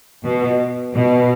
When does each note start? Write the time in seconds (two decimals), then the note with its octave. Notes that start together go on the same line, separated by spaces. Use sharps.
0.24 B2
0.93 B2